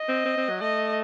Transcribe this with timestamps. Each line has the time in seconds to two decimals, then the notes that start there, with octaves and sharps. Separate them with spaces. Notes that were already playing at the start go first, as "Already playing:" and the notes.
Already playing: D#5
0.08 C4
0.25 C4
0.37 C4
0.49 F#3
0.61 A3 D#5